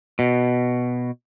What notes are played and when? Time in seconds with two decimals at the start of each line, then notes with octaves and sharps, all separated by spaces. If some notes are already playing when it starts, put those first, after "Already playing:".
0.19 B2